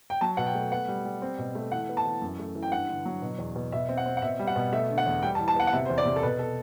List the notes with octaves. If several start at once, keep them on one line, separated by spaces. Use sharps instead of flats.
G5
F#3 A5
B2 F#5
G5
A3
B3 F#5
G3
G3
C4
B2
A3
E3 F#5
B3
A5
E3
F#2
A3
E3
G5
G2 F#5
D3
F#3
B2
E2
B2
B2 E5
C4
F#5
C4
F#5
B2 E5
G3
F#5
B2
A3 E5
D3
F#5
E2
G3 G5
A5
E3
A5
B3 F#5
F#5
C3 E5
E2 C5
D5
C3
A4
B2 B4
A4